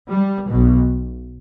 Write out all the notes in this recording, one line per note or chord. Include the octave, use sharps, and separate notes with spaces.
G3
B1 B2